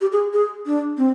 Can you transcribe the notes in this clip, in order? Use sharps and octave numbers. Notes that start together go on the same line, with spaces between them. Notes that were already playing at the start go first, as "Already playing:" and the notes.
G4
G#4
G#4
D4
C4